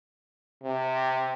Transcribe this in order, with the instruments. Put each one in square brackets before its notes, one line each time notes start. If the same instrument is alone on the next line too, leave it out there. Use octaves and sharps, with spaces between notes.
[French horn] C3